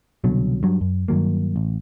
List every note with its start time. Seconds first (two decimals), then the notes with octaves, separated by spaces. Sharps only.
0.24 C2 B2 D3 F#3
0.63 G2 F#3
0.81 F#2
1.08 G2 D#3 F#3 A#3
1.56 A1